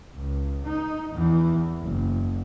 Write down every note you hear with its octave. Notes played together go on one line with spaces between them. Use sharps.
C#2
D#4
E2 E3
F#1